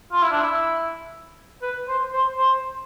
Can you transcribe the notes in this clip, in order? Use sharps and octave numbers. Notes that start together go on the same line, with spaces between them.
F4
E4
D4
E4
B4
C5
C5
C5